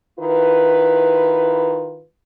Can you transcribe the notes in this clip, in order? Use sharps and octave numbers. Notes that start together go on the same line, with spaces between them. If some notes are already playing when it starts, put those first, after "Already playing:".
D#3 E4 F4 B4